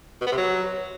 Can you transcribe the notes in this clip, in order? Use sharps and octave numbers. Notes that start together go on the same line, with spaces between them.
B2
B3
C3
F#3